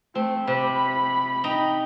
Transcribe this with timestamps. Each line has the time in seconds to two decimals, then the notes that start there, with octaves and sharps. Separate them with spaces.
0.15 A3 C4
0.47 C3 B5
1.44 D#4 G5 A#5